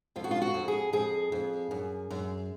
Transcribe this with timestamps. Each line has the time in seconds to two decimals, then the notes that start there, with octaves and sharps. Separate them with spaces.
0.16 F2 F4
0.24 F#4
0.31 F4
0.42 F#4
0.54 F2
0.68 G#4
0.93 F2 G#4
1.32 F2
1.71 F#2
2.10 F#2